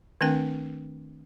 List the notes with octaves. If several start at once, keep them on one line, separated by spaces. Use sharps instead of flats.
D#3 A3 C4 D4 A#4 G5